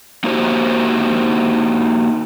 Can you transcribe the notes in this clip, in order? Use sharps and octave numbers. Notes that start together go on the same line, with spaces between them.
A#3 D#4 F#4 G4 A#4 C5